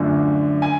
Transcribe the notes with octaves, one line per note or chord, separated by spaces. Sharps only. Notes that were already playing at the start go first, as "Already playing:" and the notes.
Already playing: F#2 D3 F3 A3 D4
G#5